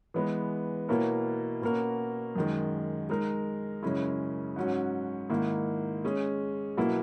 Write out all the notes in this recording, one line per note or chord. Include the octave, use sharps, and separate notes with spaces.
E3 G#3 B3
B2 A#3 E4 A#4 C#5
B2 A#3 C#4 F#4 A#4
F#2 D#3 G#3
G#3 D#4 A#4
F#2 C#3 G#3 C#4 E4
G#2 F#3 C#4 F#4
G#2 D#3 A#3 E4
G#3 C#4 G#4
B2 F#3 A#3 E4